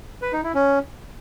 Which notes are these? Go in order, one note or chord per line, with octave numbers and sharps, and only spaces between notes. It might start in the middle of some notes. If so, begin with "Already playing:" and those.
B4
D#4
E4
C#4